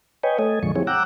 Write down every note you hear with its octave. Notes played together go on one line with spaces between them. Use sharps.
B4 C#5 D#5 G5 G#5
A3 A4 D#5 G#5
F2 A#2 D3 F3 G#3 C#6
F3 G3 C4 E4 G#4 C#5
F#5 G5 A#5 D6 E6 F#6